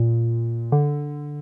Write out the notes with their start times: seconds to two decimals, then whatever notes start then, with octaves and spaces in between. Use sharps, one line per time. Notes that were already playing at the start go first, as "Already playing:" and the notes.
Already playing: A#2
0.72 D3